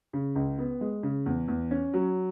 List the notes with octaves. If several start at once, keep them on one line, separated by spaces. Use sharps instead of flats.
C#3
C#2
B3
G#3
C#3
E2
E2
C#4
F#3